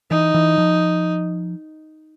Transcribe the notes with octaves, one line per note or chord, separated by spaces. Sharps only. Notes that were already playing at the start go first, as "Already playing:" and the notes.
E3 D#4
E3
F3